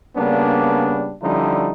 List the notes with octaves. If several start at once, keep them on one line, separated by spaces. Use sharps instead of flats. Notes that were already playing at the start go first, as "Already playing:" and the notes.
C#3 G3 A#3 B3 D4
D3 F3 G3 C#4 D#4 E4